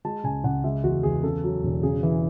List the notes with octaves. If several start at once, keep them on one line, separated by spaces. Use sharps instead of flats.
G#3 A5
C#2 G#5
C#2 F#5
G#3 E5
E2 F#4
E2 G#4
C#3 A4
F#3
E1
C#3 G#4
E3